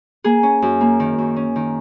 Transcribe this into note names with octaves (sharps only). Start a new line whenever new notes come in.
A#3 G#4
C#4
F#2
A#3
D#3
F#2
C#4
D#3